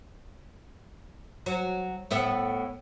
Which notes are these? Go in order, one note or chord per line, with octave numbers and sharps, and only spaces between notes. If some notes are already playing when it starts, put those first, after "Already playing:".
F#3
A2 B3 E5